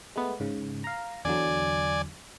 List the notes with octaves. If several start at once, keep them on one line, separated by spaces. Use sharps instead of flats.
G#3 A3 B3
G#2 C#3
F5 A#5
E2 D3 F#3 D5 G#5